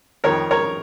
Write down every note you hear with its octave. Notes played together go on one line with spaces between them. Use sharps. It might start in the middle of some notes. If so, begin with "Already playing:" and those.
F2 D#3 A#4 C#5
A#4 C#5